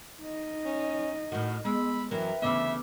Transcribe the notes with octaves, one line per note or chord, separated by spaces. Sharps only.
D#4 D#5
C#4
A2 D#3 F#4
G#3 B3 B5 E6
F#2 E3 F#3 A#4 B4 E5 G5
D2 C#3 E3 B3 E5 D6 E6